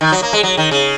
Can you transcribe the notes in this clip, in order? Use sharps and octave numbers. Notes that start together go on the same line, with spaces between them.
D#3
F#3
A#3
G#3
F#3
D#3
C#3